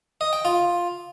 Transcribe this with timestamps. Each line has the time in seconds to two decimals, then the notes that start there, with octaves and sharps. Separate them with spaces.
0.21 D#5
0.33 G5
0.45 F4